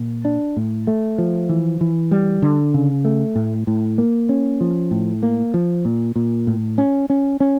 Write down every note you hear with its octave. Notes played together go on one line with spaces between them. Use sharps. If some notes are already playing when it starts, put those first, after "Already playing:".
Already playing: A#2
D4
A2
A3
F3
E3
E3
G3
D3
C#3
A3
A2
A2
A#3
C#4
F3
A2
A#3
F3
A#2
A#2
A2
C#4
C#4
C#4